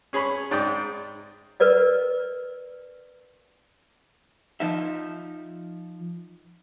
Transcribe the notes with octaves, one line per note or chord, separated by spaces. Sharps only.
C#4 G#4 C#5 B5 C#6
G#2 D5 G5 D#6
A#4 B4 D5 D#5
F3 D#4 E5